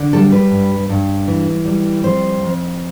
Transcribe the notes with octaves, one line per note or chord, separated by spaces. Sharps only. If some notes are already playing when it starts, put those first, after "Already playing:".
Already playing: D3
G3 A4
B4
G2
G2
E3
G3
F2 C5
F2